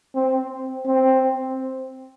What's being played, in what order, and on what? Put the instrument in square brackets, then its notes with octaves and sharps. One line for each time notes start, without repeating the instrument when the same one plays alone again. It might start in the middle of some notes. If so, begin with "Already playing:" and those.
[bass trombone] C4
C4